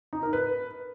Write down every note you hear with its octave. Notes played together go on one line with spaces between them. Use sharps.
D#4
A#4
B4